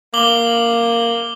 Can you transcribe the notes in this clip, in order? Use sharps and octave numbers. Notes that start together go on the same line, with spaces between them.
A#3 D6 F#7 G7